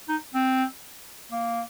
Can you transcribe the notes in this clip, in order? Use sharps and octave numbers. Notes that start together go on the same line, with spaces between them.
D#4
C4
A#3